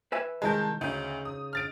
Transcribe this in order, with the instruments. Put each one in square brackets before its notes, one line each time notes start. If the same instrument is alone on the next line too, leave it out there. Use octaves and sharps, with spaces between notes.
[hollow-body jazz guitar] B4 E5 G#5
[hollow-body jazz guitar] C2 D#3 A#4 [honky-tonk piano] G#3 A5 G6
[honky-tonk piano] D2 [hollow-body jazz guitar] C#3 D#4
[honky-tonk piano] D#6
F6 A6 D7